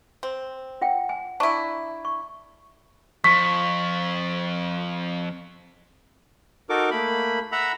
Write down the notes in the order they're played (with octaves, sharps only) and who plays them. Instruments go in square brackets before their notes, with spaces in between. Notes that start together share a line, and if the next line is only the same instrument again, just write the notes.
[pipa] C4
[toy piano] F4 F#5 G5
G#5
[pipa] D4 E4 [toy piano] A5 A#5 C#6
[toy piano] C#6
[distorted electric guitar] F2 [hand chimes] C#6 [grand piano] B6
[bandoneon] D#4 F#4 A4 A#4 D6
A3 A#3 B5
E5 F#5 A#5 B5 E6